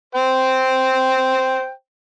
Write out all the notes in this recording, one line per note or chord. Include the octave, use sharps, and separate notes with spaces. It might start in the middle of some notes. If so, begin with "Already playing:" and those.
C5 G5